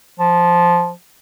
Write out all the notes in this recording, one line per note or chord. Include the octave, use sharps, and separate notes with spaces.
F3